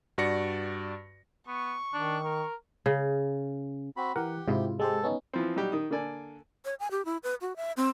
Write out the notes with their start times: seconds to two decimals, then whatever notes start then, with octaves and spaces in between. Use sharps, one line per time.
0.18 G2 F#4 D5 A#6 C#7
1.48 B3 C#6
1.93 D#3 D4
2.25 A#4
2.86 C#3
3.97 C4 F#4 B5
4.16 E3 G4 A#4 F#5
4.48 G#2 C3 E4 F4
4.80 G#3 G4 A4 C5
5.03 B3 C#4 D#4
5.33 E3 F3 C4
5.56 F#3 G3 D#4 G4
5.72 D#3 D#6
5.91 D3 A#3 A4 D5 G#5
6.65 C#5
6.80 G#5
6.91 G4
7.05 E4
7.23 B4
7.41 F#4
7.56 E5
7.77 C4